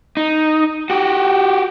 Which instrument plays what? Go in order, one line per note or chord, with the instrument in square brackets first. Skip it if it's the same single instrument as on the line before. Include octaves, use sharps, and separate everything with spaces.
[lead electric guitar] D#4
F#4 G4